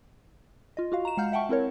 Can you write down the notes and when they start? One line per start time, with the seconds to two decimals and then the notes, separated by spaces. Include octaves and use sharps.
0.77 F4 D#5
0.92 F4 F#4 F5
1.05 A#5 E7
1.17 G#3 F5 F#5 F6 G6
1.32 E5 F#5 G5 A5 C#6
1.49 C4 E4 A#4 C#5